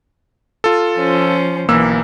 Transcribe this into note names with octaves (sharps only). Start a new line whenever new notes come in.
F4 A4
F3 C#4 C5
B1 E3 A#3 E6